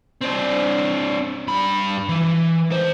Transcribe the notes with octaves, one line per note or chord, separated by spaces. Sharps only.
C4 D4
G2 B5
E3
D#3 C5